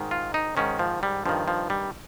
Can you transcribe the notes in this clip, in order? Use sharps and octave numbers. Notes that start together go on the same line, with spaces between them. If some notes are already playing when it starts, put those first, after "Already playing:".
Already playing: G#2 D#3
F4
D#4
G#2 D#3 C#4
F3
G3
G2 D#3 F3
F3
G3